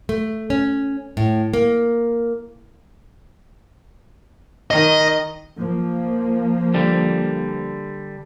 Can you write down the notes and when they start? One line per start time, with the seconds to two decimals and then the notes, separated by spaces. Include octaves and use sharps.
0.09 A3
0.50 C#4
1.17 A2
1.53 A#3
4.71 D#3 D#5
5.58 F3 A#3
6.74 D3 G3